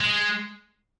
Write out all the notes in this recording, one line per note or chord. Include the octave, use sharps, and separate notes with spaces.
G#3